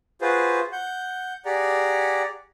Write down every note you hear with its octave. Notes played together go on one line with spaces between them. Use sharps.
F4 F#4 G#4 B4 C5
F#5 G6
G4 G#4 D5 F#5 A#5